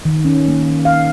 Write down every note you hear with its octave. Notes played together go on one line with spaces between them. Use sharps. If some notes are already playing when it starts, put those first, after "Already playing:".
D#3
C#4
A#3
F5